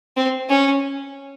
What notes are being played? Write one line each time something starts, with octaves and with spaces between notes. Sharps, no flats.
C4
C#4